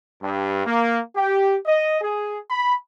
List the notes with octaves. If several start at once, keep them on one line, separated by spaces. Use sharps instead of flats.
G2
A#3
G4
D#5
G#4
B5